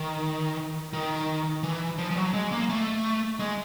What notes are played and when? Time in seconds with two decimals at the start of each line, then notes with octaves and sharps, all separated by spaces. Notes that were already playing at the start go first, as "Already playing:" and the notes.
Already playing: D#3
0.93 D#3
1.63 E3
1.98 F3
2.11 F3
2.17 F#3
2.34 G#3
2.51 A#3
2.69 A3
3.39 G#3